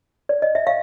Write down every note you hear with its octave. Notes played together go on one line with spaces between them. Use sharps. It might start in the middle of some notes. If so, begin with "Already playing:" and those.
D5
D#5
E5
F5